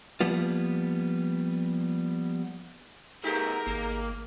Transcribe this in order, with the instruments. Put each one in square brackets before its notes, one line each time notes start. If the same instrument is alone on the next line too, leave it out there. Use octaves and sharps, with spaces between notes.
[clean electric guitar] F3 G3 A#3 B3 F4
[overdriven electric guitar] A3 B3 [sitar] D#4 G4 G#4 [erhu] A#4
[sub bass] G#1 [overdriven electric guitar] A#3